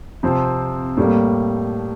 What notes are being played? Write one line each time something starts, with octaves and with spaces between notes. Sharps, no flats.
C3 F3 C4
A2 G3 A#3